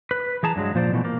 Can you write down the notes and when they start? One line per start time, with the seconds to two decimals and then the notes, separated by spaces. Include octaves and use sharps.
0.11 B4
0.43 E3 G#4 A5 A#5
0.56 G2 F#3 G#3
0.75 A#2 F3 C5 D5
0.93 B2 E3 F3 A3
1.05 A#3